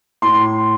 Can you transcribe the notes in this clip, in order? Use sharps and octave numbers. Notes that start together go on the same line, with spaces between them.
A2 C6